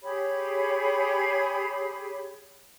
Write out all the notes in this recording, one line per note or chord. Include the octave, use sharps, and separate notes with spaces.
G4 G#4 C#5 B5